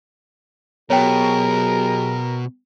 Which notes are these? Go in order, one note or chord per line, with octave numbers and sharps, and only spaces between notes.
B2 F#3 G4 G#4 A#4 C#5 G5